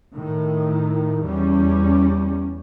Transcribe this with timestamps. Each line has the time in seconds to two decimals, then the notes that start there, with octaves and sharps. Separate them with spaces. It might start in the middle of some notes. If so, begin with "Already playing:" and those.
0.13 A2 D#3
1.23 E2 G3 C#4